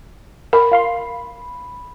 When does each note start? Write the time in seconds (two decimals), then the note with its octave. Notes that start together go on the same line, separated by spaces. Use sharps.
0.53 A#4 B5
0.71 F4 F5 C6